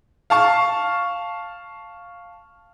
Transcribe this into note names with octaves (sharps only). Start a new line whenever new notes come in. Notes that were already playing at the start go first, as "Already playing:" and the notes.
F5 A5 C#6